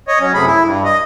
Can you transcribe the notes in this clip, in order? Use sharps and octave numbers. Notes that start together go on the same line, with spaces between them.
C#5 D#5
F#3 C#4
F#2 C3 A3 G#4 B5
E4
G2
D#5